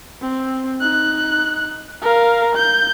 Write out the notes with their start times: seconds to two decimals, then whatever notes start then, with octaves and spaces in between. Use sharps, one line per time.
0.21 C4
0.81 D#4 F#6
2.02 A#4 F5
2.55 G6